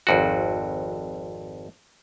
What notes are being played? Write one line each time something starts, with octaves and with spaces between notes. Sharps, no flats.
G#1 F2 F#4